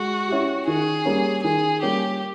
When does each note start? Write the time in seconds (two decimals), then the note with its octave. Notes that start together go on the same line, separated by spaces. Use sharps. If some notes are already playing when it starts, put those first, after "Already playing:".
Already playing: G#3 F#4
0.28 C#4 E4 G4
0.67 D#3 G#4
1.05 G3 A#3 C#4
1.44 D#3 G#4
1.82 G3 A#3 C#4 G4